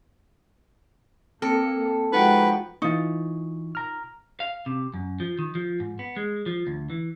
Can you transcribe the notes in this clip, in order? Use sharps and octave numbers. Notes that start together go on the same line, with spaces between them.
A#3 C4 A4 C#7
F3 G#3 D#4 F#4 B4 F#5 G5
E3 D#4 F4 C#6
A#5 F6
F5
C3
F#2
F3
D#3
F3
G#2
B3
G#3
F3
D2
E3